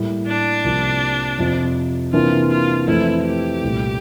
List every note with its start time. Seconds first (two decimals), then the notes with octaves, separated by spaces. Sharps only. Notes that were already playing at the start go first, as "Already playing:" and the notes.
Already playing: A2 G3 A#3
0.27 D4
0.64 C2 C3 F3 A#3
1.39 F2 C3 F3 C4
2.13 C3 E3 A#3 D4 F4
2.51 F4
2.87 F2 E3 A3 C4 E4
3.25 G4
3.62 C2 A#2 A3